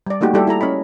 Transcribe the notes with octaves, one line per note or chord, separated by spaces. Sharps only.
G3 D5
A3 A#3 D#4 F#4 G4
G3 E4 G4 A4 D5 E5
E4 A4 A#5
C#4 C#5 D#5 B5